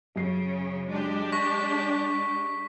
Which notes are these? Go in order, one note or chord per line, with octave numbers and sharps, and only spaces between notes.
F#2 C#3 C7
G#3 D4 G4
C#6 A#6 B6